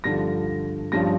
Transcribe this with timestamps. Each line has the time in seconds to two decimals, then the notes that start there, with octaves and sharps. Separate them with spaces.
0.04 G2 D3 F3 A#6
0.92 G2 F3 C#4 A#6